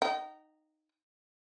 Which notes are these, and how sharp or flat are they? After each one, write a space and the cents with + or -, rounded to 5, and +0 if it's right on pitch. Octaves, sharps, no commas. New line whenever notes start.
D#4 -10 G5 -45